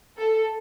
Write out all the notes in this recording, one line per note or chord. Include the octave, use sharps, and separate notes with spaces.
A4